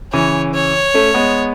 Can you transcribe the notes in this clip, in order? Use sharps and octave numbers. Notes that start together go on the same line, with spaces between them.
C#3 E3 C#5
C#5
A3 C#4
G#3 B3